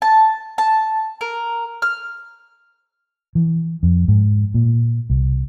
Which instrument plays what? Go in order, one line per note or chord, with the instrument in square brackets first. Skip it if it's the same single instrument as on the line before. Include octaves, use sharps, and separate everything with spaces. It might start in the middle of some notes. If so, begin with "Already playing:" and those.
[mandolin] A5
A5
A#4
F6
[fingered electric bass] E3
F2
G#2
A#2
C2